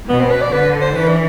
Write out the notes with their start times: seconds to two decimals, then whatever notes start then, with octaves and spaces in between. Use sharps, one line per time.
0.09 B2 B3
0.20 C4
0.31 B4
0.42 D5
0.52 D3 B4
0.81 C5
0.95 E3 B4
1.08 D4